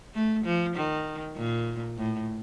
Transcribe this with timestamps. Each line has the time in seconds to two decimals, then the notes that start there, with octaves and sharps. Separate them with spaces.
0.15 A3
0.45 F3
0.76 D#3
1.37 A#2
1.97 A2